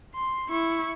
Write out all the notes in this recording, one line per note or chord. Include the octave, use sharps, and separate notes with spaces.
C6
E4 C#6